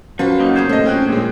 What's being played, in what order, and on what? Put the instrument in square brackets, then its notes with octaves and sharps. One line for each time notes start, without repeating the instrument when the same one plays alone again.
[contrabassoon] F#2 [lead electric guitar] F3 [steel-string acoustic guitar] F4 F#4 B4
[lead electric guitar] A#3 D#4
[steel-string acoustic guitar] E2 C#3 G3 [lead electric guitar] G#4 C5
[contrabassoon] D#1 [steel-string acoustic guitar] A2 [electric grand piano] A3 A4 D#5
[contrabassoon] F1 [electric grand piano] C#4 G5 F#6
[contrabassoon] A#1 [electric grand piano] A#2 G#3